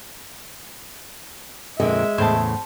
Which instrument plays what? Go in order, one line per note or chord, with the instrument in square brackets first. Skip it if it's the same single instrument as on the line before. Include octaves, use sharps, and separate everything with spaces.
[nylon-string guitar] F2 A#2 D3 [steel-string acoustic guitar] G#3 [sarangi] E5
[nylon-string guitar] E2 A2 C#3 [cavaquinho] C5 A5